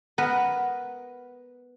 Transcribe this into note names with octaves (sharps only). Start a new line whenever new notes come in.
B3 A#4 B4